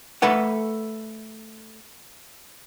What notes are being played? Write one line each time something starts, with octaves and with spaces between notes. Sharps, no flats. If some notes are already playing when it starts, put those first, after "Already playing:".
A3 A4 B4 F#5